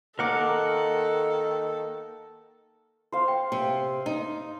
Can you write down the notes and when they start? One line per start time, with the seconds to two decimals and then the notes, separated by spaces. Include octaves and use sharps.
0.19 D#3 A#3 A4 A#4 F5 F#5 D6
3.12 C5 F5
3.28 G5
3.52 C3
4.06 D#4 D#5